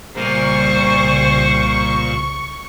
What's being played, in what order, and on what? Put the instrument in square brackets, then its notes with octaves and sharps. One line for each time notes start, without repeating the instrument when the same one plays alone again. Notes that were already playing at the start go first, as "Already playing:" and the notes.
[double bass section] C2 C#3 [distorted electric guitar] A#2 [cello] G3 C5 [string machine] C#6